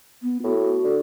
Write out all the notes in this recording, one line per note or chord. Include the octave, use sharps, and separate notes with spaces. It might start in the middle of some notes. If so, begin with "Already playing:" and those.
B3
A2 F#4
D3